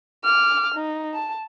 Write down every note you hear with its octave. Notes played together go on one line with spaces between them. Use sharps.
D6 F6
D#4
A5